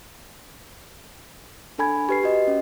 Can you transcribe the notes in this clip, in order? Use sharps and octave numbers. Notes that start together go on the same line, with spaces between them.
D4 A4 G#5 B5 G#6
G4 B4 C7
F#4 D#5
C#4